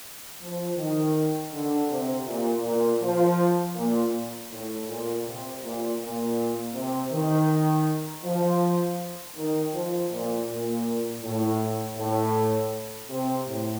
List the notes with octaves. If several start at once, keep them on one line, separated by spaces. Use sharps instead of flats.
F3
D#3
D3
C3
A#2
A#2
F3
A#2
A2
A#2
C3
A#2
A#2
C3
D#3
F3
D#3
F3
A#2
A#2
A2
A2
C3
A2